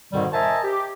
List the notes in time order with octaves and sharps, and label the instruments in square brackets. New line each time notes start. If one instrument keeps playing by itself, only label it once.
[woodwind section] F2 G#2 B2 D3 D#3 G3
A#4 C5 D#5 E5 G#5 A5
G4